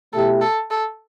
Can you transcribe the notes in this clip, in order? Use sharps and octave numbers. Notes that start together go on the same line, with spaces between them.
B2 A3 E4 G4 A4
A4
A4